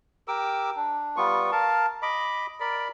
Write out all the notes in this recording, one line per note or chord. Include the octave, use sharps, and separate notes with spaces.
G4 A#4 D6 E6
D4
G3 B3 F4 C#6
A#4 F5 A5
D#5 B5 D6
A#4 D5 B5